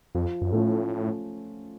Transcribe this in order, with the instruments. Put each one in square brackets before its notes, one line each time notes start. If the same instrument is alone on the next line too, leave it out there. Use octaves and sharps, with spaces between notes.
[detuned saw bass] F2 [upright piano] F3
[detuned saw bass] F#2
[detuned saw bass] A2 [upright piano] A3 C#4 F4